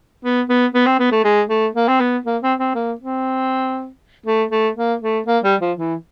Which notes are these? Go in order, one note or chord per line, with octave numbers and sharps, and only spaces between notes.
B3
B3
B3
C4
B3
A3
G#3
A3
A#3
C4
B3
A#3
C4
C4
A#3
C4
A3
A3
A#3
A3
A#3
G3
F3
E3